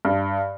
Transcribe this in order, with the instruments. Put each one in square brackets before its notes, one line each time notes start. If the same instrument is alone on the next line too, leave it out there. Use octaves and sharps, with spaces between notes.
[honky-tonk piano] G2